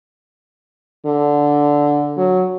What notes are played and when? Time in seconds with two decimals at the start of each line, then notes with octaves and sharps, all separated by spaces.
1.06 D3
2.17 F#3